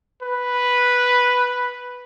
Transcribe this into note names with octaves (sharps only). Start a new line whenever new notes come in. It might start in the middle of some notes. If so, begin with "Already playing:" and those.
B4